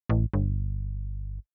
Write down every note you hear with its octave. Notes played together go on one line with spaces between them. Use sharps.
A1
G1